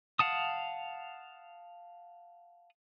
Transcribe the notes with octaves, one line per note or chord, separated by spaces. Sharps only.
F5 F#5 A5 D#6